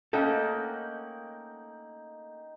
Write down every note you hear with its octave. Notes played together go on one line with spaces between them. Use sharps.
A3 A#3 C#4 D#4 A4 F#5 G5